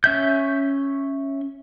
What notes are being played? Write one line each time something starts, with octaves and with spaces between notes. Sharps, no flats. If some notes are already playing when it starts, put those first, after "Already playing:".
C#4 E5 G6